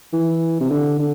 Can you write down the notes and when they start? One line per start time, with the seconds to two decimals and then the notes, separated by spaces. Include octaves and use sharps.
0.13 E3
0.60 C3
0.70 D3
0.99 D3